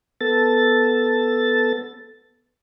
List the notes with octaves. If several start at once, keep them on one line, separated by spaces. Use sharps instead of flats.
B3 A4 A6